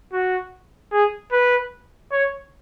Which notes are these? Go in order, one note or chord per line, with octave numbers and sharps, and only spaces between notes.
F#4
G#4
B4
C#5